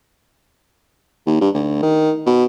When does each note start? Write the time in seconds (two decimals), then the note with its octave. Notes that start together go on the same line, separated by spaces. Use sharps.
1.26 D#2
1.41 G2
1.54 D2
1.83 D#3
2.26 B2